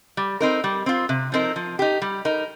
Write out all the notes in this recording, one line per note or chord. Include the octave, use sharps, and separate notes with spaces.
G3
C4 D#4 A#4
G3
C4 F4
C3
F3 C4 D#4 A#4
F3
D#4 G4
G3
D#4 A#4